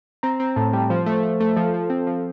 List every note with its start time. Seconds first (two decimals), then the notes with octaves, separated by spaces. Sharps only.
0.23 C4 A#5
0.40 C4
0.56 A2 A5
0.73 G3 G5
0.90 F3 C5
1.06 A3
1.23 A3
1.40 A3
1.57 F3 A4
1.74 F3
1.90 C4
2.07 F3